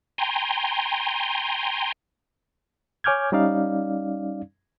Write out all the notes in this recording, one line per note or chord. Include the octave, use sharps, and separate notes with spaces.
G5 G#5 A#5 C6
C#5 G#5 D6 F6 G6 G#6
G3 C#4 D#4 D5 F5